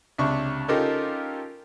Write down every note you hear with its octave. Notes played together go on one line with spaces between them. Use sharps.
C#2 C3 D4 C#6
C#4 D#4 F4 G4 A4 A#4